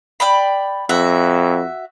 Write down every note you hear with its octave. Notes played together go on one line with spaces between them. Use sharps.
D5 G5 B5
F2 F#4 E5